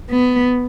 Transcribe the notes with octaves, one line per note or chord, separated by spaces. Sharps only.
B3